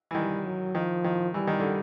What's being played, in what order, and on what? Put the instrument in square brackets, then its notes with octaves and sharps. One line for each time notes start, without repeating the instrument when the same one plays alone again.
[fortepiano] E3
[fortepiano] D#3 [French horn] G3
[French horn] F#3
[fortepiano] D#3 [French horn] F3
[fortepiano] D#3
[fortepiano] E3 [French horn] G3
[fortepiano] D#3
D3